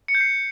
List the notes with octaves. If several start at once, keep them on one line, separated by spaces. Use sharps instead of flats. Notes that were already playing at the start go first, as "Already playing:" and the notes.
C#7
G6
C7